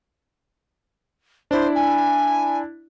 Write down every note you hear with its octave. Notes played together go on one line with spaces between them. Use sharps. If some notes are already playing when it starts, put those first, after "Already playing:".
D4 E4 C5
G#5